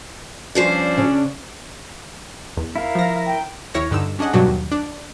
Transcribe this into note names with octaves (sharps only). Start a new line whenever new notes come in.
G2 F3 C#4 D4 C5
C#3
E2
E4 A#4 F5
F3 A#6
G5
D#2 E4 C#5 F6 A#6
G2 D3 D#4 E6
C#4 D4 G#4 D#5 F#5
G2 B2 F#3 D4
D#2
D4